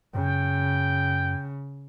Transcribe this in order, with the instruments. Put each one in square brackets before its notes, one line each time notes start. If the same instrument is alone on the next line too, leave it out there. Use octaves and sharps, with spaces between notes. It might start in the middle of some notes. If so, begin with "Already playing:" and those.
[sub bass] F#2 [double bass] C#3 [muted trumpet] G5